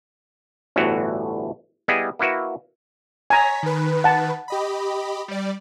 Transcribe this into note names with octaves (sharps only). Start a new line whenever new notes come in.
G1 D2 A2 E3 F#4
G3 B3 E4 G#4 D#5
A#3 E4 F#4 B4 E5
C#5 G#5 A#5 B6
D#3 B4
F#5 A5
G4 D#5 B5
G3 D5